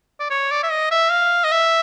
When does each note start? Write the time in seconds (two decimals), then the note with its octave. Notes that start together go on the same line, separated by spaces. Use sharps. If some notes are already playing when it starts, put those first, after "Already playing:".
0.20 D5
0.30 C#5
0.51 D5
0.63 E5
0.71 D#5
0.91 E5
1.11 F5
1.44 D#5
1.51 E5